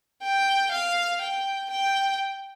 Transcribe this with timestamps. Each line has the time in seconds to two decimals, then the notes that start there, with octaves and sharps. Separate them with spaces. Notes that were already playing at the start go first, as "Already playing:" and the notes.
0.23 G5
0.72 F5
1.21 G5
1.70 G5